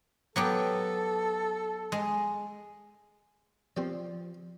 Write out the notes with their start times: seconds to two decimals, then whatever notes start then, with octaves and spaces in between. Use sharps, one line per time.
0.36 F#3 B3 G4 A4
1.92 G#3
3.77 F3 C4 G4 D5